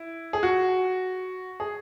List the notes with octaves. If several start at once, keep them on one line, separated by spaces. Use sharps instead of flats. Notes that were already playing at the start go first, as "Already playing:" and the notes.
Already playing: E4
G#4
F#4
G#4